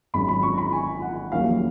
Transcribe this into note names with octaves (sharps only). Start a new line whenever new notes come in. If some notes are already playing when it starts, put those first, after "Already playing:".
G#1 G#2 F#3 C#4 B5
B5
C#6
A#5
B5
G#5
F#5
F1 D#2 C#3 F#3 A#3 F5